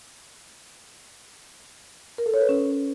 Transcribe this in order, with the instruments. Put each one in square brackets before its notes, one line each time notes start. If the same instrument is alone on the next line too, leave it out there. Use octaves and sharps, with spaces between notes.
[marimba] A#4
A4
C#5
B4
C#4